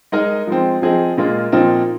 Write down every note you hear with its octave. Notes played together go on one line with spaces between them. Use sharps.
G#3 D#4 A#4 D#5
F3 G#3 C4
F3 C4 G#4 D#5
A#2 G#3 F4 A#4
A#2 F3 C4 D#4 A#4